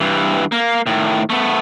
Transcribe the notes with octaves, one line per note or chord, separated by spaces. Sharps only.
G2 E3
A#3
A2 D#3
A3 B3